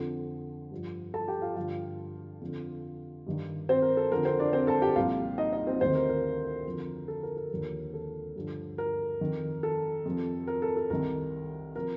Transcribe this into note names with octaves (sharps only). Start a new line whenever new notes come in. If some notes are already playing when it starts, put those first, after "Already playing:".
Already playing: F2 D3 F3
G2 F3
A4 A5
G4 G5
F4 F5
G2 D3 F3 F4 F5
F2 D3 F3
G2 D#3
C4 C5
A#4
A4
F2 D3 F3 A#4
C4 C5
D4 D5
C4 C5
A4 A5
G4 G5
C2 A#2 F3 F4 F5
D#4 D#5
D#4 D#5
C4 C5
D2 C3 D#3 C4 C5
A#4
A#4
F2 D3 F3
A4
A#4
A#4
D#2 D3 F3
A4
G2 D3 F3
A#4
F2 D#3
A4
F2 C3 F3
A#4
A4
A4
C2 C3 D#3 A#4
C3 F3 A#4